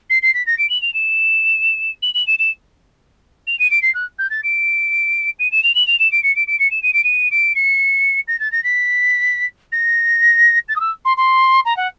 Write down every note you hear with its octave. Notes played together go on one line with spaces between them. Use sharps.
C7
C7
B6
A#6
D7
F#7
F7
E7
F#7
F#7
E7
E7
F7
D#7
D7
C7
F#6
G6
A6
D7
D#7
E7
F7
F#7
F7
E7
D7
C#7
D7
D7
C#7
E7
D#7
D7
D#7
D7
C#7
A#6
A6
A#6
B6
A#6
A6
D#6
E6
C6
C6
A#5
F#5